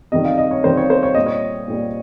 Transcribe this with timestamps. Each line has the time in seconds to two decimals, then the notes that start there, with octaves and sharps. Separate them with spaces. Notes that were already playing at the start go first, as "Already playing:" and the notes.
0.12 C3 D#3 G3 D#5
0.25 F5
0.38 D#5
0.51 C#5
0.64 C3 D#3 G3 C5
0.77 C#5
0.90 C5
1.03 C#5
1.15 A#2 G3 D#5
1.26 C#5
1.68 A#2 G3